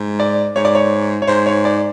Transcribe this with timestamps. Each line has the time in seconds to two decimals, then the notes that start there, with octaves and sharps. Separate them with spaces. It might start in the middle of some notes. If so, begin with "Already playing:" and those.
Already playing: G#2
0.19 D5
0.56 G#2 C#5
0.65 D5
0.75 C#5
1.22 C#5
1.28 G#2 C5
1.46 C#5
1.65 D5